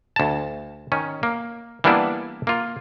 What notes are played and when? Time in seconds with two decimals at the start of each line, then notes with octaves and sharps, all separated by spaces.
0.16 D2 A5
0.92 D#3 C#4
1.23 A#3
1.84 E3 G3 A#3 B3 D4 E4
2.47 A#3 F4